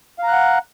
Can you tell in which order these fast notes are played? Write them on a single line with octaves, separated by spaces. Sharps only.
F5 A#5 F#6 F#5